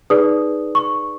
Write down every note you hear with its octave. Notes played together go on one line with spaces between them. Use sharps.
D#4 G#4 B4 D5 D#6
C#6